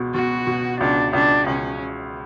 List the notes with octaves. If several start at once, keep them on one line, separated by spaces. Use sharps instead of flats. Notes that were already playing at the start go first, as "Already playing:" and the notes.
Already playing: C#2 B2
B2 F#4
B2
C#2 D4
C#2 D4
C#2 C#4